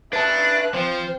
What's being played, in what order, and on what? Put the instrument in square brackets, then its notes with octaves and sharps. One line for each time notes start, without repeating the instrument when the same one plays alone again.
[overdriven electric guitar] D4 [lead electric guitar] B4 A5 [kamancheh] E5 F#6
[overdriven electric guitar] F3 [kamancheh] C4 [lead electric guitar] C5